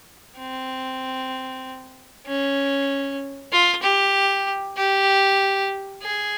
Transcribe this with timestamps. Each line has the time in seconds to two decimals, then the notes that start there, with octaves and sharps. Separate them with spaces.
0.39 C4
2.27 C#4
3.52 F4
3.83 G4
4.77 G4
6.03 G#4